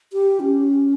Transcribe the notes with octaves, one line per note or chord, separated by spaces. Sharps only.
G4
C#4